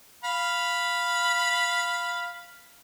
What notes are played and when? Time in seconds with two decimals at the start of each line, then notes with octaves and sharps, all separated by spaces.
0.24 F5 B5